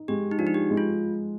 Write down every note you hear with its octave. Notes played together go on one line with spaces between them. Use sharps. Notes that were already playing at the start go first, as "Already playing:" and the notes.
Already playing: D#4
G#3 G4
D#4
F3 D4
D#4
G4
G#3
F4